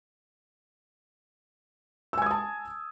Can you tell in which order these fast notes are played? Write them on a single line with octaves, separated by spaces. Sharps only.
E6 G#5 G#6 D#6 A5